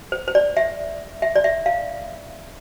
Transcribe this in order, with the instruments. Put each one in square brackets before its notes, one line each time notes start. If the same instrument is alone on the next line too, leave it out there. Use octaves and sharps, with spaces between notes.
[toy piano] C5
C5
D5
E5
E5
D5
E5
F5